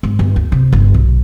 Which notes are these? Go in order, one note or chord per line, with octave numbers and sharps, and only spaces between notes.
G#2
G1
D2
C3
G1
B1